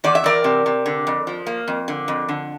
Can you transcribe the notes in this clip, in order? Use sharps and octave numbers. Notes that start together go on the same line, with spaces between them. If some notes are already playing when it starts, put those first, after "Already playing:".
E2 D5
E5
E2 A#4 D5
C3
C3
D3
F2
F3
A#3
F2
D3
F2
D3